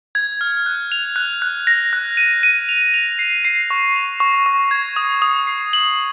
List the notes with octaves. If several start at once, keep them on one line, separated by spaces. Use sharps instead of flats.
G#6
F6
F#6
F7
F#6
F#6
A#6
F#6
D#7
D#7
F7
F7
C7
C7
C#6
F7
C#6
C#6
G#6
D#6
D#6
C7
F#7